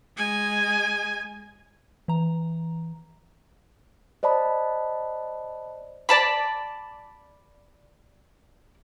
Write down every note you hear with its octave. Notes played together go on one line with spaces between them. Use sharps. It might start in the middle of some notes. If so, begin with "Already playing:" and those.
G#3 G#5
E3 A#5
C5 D5 D#5 A5 B5
D5 A5 B5